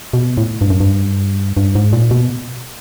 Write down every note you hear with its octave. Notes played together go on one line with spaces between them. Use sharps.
B2
A2
G2
F#2
G2
G2
G#2
A#2
B2